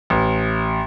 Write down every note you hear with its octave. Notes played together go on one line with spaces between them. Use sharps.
A1